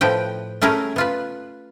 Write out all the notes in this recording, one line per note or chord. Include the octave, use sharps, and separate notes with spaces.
A2 F3 B4 G5
A3 C#4 E4 G#4 A#4
B3 F4 B4